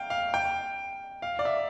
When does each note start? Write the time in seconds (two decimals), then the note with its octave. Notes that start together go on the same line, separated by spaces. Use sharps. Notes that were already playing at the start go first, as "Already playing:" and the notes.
Already playing: F5 G5
0.10 F5
0.34 G5
1.22 F5
1.39 D5
1.45 E5